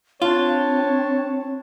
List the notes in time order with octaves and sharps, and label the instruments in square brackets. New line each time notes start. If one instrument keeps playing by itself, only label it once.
[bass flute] C4 [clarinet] D4 [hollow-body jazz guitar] F4 [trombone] C#5